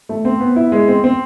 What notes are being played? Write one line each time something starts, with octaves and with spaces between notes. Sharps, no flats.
A3
C4
B3
E4
G#3
C4
C4